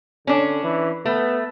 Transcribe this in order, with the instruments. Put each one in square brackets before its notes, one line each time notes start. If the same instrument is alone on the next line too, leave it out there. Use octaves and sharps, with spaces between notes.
[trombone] D3 [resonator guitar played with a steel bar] C#4 D4
[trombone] E3
[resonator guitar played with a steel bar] A3 [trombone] B3